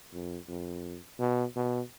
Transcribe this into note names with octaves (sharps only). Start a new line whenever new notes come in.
F2
F2
B2
B2